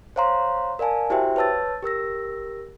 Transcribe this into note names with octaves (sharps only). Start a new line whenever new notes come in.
C5 C#5 F5 A#5 C6
A#4 D5 F5 G#5 A5
E4 F#4 G4 C5 E5 G5
B4 C#5 A5 E6 A6
G4 A#4 E6 A#6